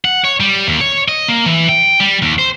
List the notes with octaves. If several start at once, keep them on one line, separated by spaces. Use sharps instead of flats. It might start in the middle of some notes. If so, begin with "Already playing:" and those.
F#5
C#5
G3
D#2
C#5
D#5
A#3
E3
G5
G3
D#2
C5